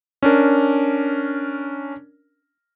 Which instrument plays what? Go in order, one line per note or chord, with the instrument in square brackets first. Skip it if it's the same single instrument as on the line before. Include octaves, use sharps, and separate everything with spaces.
[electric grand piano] C#4 D4 A#4